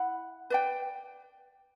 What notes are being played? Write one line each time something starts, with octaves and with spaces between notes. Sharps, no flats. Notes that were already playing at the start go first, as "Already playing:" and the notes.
Already playing: E4 F#5 B5
B4 D5 G5